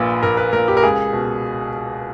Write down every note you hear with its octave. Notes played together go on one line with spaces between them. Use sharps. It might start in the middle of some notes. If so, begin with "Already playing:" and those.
Already playing: A#1 A#2 B4
A#1 A#4
B4
A#2 A#4
G4
A#4
C#2 G#4
B2